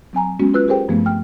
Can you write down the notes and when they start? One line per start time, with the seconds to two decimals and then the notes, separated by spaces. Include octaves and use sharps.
0.13 F#3 C4 G#5 A#5
0.39 G#3 B3 C#4 F#4
0.54 F4 B4 E6 F#6
0.68 G4 G#4 A#4 C5 G5
0.88 G2 F3 A3 B3 C4
1.06 G5 F6